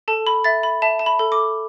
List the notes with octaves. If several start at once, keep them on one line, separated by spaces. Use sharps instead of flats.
A4 A5
B5
E5 A6
B5
E5 A5
A5
B5
A4
D6